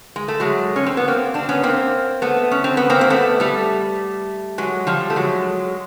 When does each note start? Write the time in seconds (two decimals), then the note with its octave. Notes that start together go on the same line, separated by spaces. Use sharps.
0.16 G#3
0.28 A3
0.40 F#3 G#3
0.76 C#4
0.86 C4
0.97 B3
1.08 A#3 C4
1.34 C4 D4
1.49 B3 C#4
1.63 A#3 C4
2.22 A3 B3
2.51 C#4
2.64 C4
2.77 B3
2.90 A#3 C4
3.01 A#3
3.10 A3 B3
3.40 G3 A3
4.58 F#3 G#3
4.87 F3 G3
5.10 A3
5.16 F#3 G#3